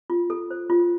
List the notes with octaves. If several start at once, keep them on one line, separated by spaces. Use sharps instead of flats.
F4
A4
C5
F4